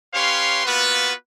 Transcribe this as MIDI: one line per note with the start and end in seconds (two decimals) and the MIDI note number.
0.14 0.62 61
0.14 0.62 67
0.14 0.62 71
0.14 0.62 73
0.14 0.62 77
0.14 0.62 84
0.65 1.12 58
0.65 1.12 59
0.65 1.12 65
0.65 1.12 66
0.65 1.12 71